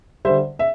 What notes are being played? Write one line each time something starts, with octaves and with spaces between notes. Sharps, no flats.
D3 G3 C5 E5
E5